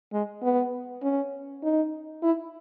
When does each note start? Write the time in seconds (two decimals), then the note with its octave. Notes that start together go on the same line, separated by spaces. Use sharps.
0.13 G#3
0.43 B3
1.03 C#4
1.63 D#4
2.23 E4